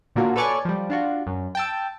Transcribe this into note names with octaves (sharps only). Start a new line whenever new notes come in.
A#2 D3 F#3 A#3 F4 F#4
A4 B4 C#5 D5 G#5 C#6
F3 G3
D4 F4 F#4
F#2
G5 A5 E6